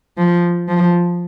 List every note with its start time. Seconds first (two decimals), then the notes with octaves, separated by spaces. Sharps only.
0.17 F3
0.68 F3